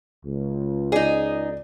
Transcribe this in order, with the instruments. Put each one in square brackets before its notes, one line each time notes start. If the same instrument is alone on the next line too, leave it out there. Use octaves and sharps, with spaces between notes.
[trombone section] C#2
[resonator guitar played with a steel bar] D#4 G#4 [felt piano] D5